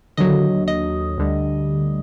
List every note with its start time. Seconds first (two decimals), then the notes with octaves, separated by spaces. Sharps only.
0.17 D#2 D3 F#3 D#5
0.68 D#5
1.18 D2 D3 G3